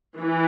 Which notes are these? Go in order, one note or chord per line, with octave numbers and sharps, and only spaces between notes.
E3